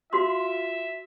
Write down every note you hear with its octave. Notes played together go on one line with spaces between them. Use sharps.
F4 F#4 E5 C6